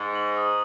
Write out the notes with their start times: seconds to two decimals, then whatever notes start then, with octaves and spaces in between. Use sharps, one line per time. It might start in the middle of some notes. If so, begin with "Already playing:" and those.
Already playing: G#2
0.15 F#7
0.37 D#6